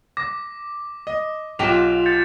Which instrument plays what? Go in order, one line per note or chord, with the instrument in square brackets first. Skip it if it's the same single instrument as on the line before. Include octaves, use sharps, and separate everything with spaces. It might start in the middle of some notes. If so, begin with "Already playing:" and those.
[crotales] D6 [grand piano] A#6
[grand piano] D#5
[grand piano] B1 [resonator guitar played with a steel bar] B2 G4 G5 [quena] F4 [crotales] E7 F7
[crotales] G6 A6 C#7